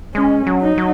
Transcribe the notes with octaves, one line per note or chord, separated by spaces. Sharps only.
G#3 C#4
F#3
D#4
F#3